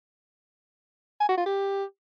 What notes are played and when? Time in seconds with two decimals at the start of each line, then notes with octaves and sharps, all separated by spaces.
1.20 G#5
1.29 F#4
1.37 F4
1.46 G4